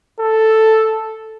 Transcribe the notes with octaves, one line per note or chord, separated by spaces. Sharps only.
A4